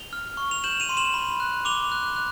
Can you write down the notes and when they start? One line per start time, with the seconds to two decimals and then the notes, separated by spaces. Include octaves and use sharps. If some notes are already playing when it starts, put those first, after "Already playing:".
Already playing: F7 G7
0.13 F6
0.37 C#6
0.51 F7
0.64 G6 E7 F#7
0.80 D#7 F7
0.89 C6
0.97 E7 F#7
1.14 B5
1.40 F#6
1.65 D6 F7 G7
1.92 F#6
2.16 F#6